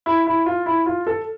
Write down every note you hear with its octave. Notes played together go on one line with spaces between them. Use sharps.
E4
E4
F4
E4
F4
A4